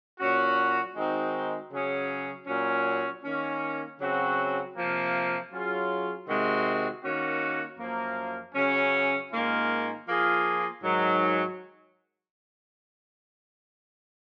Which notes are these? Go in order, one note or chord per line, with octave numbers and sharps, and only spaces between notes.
A#2 F#3 C#4 F#4
D#3 G#3 C4 D#4 F#4
C#3 F#3 C#4 G#4
A#2 F#3 C#4
D#3 A#3 C#4
C#3 F#3 C4 F#4
C3 F3 A#3
F#3 C#4 F4 G#4
C3 D#3 G#3 C4 F#4
D#3 A#3 C#4 F#4
F#2 F3 A#3
C#3 F#3 C#4
G#2 D#3 A#3 C#4 F4
F3 A#3 F4 G#4
G#2 D#3 F#3